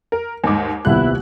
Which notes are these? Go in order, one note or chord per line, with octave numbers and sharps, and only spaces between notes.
A#4
D#2 G#2 G#5 D6
D#1 C2 B3 E4 G4 F#6